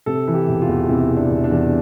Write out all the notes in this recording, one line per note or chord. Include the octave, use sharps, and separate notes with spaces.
C3 A4
E3
G4
E1
F4
E2
C3 E4
E3
D4
E1
D4
E2